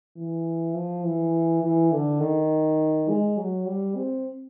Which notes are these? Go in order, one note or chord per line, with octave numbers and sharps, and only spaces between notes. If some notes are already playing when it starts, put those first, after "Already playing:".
E3
F3
E3
E3
D3
D#3
G#3
F#3
G3
C4